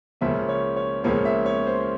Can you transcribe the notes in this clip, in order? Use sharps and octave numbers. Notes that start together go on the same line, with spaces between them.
C#2 C#3 F3 A#3 C#4 E5
C#5
C#5
C#2 C#3 F3 A#3 C#4 C#5
E5
C#5
C5